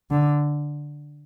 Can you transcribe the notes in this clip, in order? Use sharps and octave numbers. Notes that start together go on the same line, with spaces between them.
D3